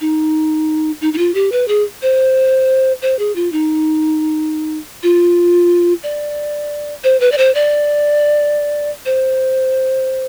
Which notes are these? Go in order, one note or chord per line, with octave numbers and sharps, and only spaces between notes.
D#4
D#4
D#4
F4
G4
B4
G#4
C5
C5
G#4
F4
D#4
F4
D5
C5
B4
D5
C5
D5
C5